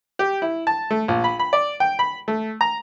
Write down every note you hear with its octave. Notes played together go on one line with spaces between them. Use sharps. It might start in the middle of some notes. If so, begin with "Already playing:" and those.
G4
E4
A5
A3
A#1
B5
B5
D5
G5
B5
A3
A#5